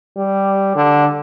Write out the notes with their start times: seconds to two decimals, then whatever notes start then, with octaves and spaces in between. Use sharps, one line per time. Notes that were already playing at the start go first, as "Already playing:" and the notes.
0.16 G3
0.75 D3